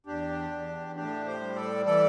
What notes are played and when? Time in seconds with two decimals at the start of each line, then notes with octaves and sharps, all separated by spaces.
0.06 E2 D4 G4
0.51 E2
0.96 A2 D4 G4
1.26 G4 C5
1.40 G3
1.56 A4 D5
1.85 E3 A4 D5